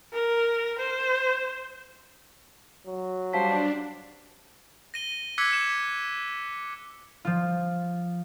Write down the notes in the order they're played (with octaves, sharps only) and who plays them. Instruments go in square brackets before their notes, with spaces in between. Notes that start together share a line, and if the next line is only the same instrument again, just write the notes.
[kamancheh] A#4
C5
[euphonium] F#3
[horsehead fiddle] G3 C5 [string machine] D4 [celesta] F5 A5 B6
[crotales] A#6 D#7 G7
D6 E6 F#6 G#6 B6 C#7
E7
[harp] F3 F4